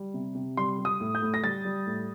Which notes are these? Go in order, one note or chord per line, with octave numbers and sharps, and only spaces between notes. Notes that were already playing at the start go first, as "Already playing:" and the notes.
Already playing: G3
C3
C3
G3 C6
G3
D#6
A2
G6
A2
A#6
G3 A6
G3
A2